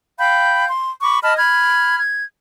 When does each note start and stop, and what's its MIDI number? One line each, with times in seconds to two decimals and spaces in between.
0.18 0.66 77
0.18 0.66 79
0.18 0.66 83
0.18 0.66 91
0.68 0.89 84
1.01 1.19 83
1.01 1.19 85
1.01 1.19 86
1.23 1.36 75
1.23 1.36 81
1.23 1.36 83
1.23 1.36 89
1.37 1.99 83
1.37 1.99 89
1.37 1.99 92
1.99 2.24 92